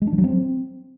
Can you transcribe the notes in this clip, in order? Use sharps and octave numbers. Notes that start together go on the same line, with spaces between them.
G#3
D4
F3
F#3
C4